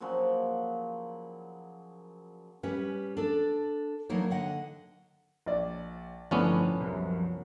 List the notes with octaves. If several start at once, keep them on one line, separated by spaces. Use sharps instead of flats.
A#2 C#3 F3 F#3
G3 C#4 B4
D4 A4
E3 F#3 A#3 D4 D#4 C#5
D3 D#5 F#5
A#1 D5
G1 A2 F3 B3 C#4 D4
C2 F#2